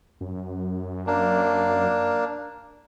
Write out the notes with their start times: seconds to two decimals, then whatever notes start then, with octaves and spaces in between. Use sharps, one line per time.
0.21 F#2
1.07 A#3 D4